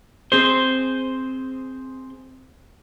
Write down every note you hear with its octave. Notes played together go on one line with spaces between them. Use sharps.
C4 G#4 C5